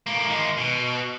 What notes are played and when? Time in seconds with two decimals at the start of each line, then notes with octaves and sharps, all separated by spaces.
0.07 A2 A#3
0.28 D#3 G#3
0.57 B2